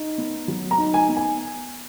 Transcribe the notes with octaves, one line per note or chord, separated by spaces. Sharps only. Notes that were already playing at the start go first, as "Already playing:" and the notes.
Already playing: D#4
B3
F#3
A#5
D#4
G#5
B3
G#5